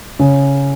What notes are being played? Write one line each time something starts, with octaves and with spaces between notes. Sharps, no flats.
C#3